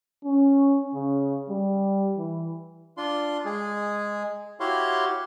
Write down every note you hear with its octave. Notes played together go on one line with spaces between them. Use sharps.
C#4
C#3
G3
E3
D4 F4 C6
G#3 G#4
E4 F#4 G4 C#5 F5 C6